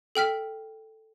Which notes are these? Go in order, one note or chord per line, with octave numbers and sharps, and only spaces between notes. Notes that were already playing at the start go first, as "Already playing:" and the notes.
A4 G5 F6 B6